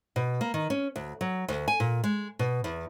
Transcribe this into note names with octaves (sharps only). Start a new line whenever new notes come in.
B2
A#3
D#3
C#4
D2
F#3
D2
G#5
A#2
G#3
B2
E2